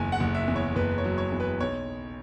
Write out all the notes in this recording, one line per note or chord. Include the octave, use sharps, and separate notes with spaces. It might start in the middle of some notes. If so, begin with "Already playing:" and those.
Already playing: F#1 E2 G#5
F#5
F#1
E5
E2
C#5
F#1 B4
C#5
F#3
C#5
E2
B4
B1 C#5